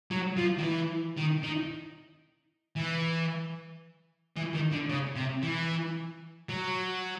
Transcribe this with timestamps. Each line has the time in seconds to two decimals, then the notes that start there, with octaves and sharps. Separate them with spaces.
0.11 F#3
0.37 F3
0.58 D#3
0.63 E3
1.17 D#3
1.43 D#3
2.76 E3
4.36 E3
4.54 D#3
4.71 D3
4.89 C#3
5.15 C3
5.43 E3
6.49 F#3